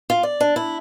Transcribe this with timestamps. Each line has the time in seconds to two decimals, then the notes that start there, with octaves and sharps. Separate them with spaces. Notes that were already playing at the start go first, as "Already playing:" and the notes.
0.10 F4
0.23 D5
0.40 D4
0.56 E4